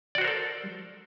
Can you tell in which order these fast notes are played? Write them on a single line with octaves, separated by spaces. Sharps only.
D5 F#4 C5 A#4 A4